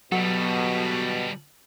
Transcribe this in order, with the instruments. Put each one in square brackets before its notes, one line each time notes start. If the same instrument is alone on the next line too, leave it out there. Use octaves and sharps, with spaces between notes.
[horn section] B2 [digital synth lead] F#3 [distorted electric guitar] G3 A4